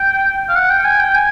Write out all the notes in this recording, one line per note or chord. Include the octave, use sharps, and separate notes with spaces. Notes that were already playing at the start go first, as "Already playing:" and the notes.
Already playing: G5
F5
F#5
G5
G#5
G5
G#5